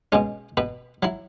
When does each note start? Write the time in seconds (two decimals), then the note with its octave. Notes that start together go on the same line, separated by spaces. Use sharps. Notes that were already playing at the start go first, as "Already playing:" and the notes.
0.12 B2 G#3 C#4
0.57 B2 B4
1.03 F#3 E4